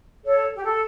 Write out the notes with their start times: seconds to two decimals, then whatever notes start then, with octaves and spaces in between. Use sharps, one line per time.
0.24 A4 C#5
0.55 G4
0.63 A4